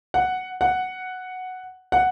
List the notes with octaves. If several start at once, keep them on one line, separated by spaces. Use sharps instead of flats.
F#5
F#5
F#5